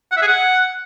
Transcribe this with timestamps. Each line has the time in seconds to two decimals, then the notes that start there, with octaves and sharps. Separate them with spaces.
0.12 F#5
0.17 E5
0.22 G#4
0.27 F#5